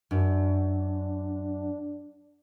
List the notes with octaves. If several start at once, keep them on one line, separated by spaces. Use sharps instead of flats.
F#2 D4